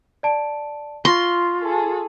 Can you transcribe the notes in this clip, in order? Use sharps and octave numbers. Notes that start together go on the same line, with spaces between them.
D5 A5 D7
F4 C6 C#6 A#6 C7
G#4 A4